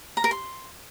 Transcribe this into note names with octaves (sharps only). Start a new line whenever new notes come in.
A#5
A#4
C6